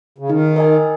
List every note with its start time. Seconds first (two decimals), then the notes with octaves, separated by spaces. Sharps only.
0.18 C#3
0.30 D#3 D#4
0.56 A#4 D#5 G#5